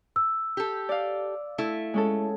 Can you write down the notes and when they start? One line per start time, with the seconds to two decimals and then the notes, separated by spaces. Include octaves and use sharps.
0.16 E6
0.57 G4 A4
0.89 D5 F5
1.58 A3 E4
1.94 G#3 C#4 A4